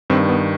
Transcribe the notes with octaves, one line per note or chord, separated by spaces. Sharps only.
G2 D#3 C4
B3